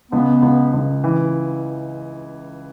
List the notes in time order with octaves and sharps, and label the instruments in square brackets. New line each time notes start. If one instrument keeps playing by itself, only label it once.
[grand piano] C#2 [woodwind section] B3
[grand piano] C#2
C#2
E3